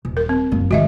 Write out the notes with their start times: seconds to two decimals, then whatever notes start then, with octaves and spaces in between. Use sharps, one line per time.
0.05 D#1
0.17 A#4
0.29 C4
0.51 F#1 A#3
0.71 G#1 D#3 F#4 D#5 E5